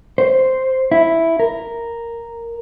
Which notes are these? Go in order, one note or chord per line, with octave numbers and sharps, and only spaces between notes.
C5
E4
A#4